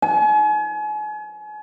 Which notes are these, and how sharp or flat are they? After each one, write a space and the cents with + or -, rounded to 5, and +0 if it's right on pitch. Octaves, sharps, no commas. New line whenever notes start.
G#5 +35